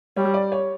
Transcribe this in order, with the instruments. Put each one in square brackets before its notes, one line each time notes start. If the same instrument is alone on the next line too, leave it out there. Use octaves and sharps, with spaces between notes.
[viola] G3 [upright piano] C#5
[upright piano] D5
C#5